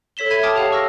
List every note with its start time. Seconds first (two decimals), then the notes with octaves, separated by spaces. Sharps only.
0.17 A4 C#5 B6 E7 G7
0.30 E5 B5 G#6 B6 D#7 G7
0.43 G5 A5 D6 D#6 F6
0.55 G4 G#4 C#5 F5 F#5 A5
0.72 C#6 E6 F6 A#6